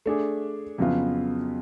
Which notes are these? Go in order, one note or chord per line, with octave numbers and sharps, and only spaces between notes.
A3 D4 G#4
F2 C#3 F#3 B3 F4